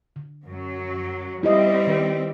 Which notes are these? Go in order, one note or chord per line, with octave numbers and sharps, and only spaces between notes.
D3
F#2 F#3
G3 C4 E4 G4 D#5
D#3 B4